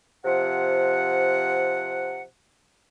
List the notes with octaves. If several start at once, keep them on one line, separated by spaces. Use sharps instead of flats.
C3 F3 F#5